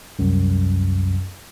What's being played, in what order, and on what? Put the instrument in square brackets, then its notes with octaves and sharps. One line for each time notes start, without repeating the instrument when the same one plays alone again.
[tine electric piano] C2 F#2